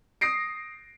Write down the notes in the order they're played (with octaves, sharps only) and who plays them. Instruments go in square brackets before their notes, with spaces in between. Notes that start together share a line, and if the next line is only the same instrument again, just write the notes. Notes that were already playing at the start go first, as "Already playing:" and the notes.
[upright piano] D#6 A#6 C7 D7